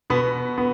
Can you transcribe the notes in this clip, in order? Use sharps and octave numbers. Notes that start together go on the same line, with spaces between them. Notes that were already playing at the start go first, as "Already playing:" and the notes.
B2 B3
B3